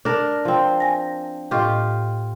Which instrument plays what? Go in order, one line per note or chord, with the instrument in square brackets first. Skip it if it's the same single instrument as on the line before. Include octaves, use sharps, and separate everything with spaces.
[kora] D4 A#4
F3 C4
[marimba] G#5 A#6
[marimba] A2 D#5 C#6 [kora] F4 G4